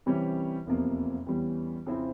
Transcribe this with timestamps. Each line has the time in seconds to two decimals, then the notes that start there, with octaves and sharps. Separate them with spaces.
0.06 C3 E3 G3 C#4 G4
0.66 F1 E2 C3 F3 A#3
1.26 E2 E3 G3 C#4
1.86 F2 C#3 F3 C4 E4